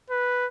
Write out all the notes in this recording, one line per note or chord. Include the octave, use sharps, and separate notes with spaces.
B4